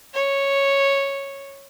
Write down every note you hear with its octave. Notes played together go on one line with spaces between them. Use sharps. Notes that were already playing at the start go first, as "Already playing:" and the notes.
C#5